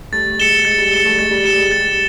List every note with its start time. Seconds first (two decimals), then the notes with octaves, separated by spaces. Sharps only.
0.12 G3 A3 A6
0.38 G#3 C#7 E7 G7
0.65 G#3 A6
0.78 G3
0.92 G#3 C#7 E7 G7
1.05 G3 A3
1.19 G#3 A6
1.31 G3
1.44 G3 C#7 E7 G7
1.58 G#3
1.71 G3 A6